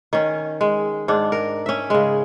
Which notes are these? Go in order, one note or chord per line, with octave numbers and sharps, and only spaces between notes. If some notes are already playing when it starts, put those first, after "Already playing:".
D#3 C#4
G#3
G#2 D4
A#4
C#4 E5
C#3 G#3